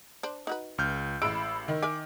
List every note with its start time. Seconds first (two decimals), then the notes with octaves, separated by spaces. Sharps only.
0.23 D4 C5
0.47 D#4 F#4 B4
0.78 C#2 F6 G6
1.22 A1 G#3 B5 E6 D7
1.68 D#3
1.83 A#4 E5 G#5 D6